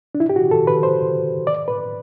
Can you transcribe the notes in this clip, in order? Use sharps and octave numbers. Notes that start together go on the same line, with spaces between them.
D4
E4
G4
F#4
A4
B4
C5
D5
B4